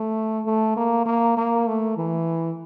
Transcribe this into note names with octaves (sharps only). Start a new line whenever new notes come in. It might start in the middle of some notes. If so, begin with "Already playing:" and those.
Already playing: A3
A3
A#3
A#3
A#3
A3
E3